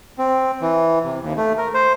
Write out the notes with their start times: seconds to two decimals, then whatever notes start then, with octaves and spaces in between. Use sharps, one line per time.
0.18 C4
0.61 E3
1.04 C3
1.22 D#2
1.37 A3
1.58 A#4
1.74 C5